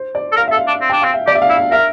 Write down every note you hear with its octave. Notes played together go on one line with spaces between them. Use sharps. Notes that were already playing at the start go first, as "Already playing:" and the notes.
Already playing: C5
D5
A4
A#4 F5
A4 E5
F5
D4
C4
D4 G5
C4 F5
E5
G4 D5
E5
F5
E4
F5
A#4 E5